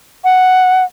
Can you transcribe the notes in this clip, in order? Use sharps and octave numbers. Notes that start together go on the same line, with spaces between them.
F#5